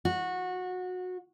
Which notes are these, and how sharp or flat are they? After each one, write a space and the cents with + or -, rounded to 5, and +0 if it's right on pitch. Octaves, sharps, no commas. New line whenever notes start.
F#4 -20